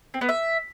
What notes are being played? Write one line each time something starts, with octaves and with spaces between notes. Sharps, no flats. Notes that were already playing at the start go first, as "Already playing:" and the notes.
C4
B3
E5